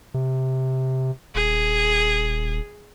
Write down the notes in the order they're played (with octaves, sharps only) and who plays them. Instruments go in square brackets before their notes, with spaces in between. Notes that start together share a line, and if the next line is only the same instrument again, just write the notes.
[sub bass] C3
[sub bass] D#1 [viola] G#4